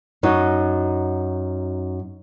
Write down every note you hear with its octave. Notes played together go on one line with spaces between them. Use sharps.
F#2 D#4 F#4